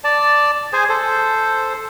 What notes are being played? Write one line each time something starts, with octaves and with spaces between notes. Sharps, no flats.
D5 A5
G#4 C5 G#5
A4 C5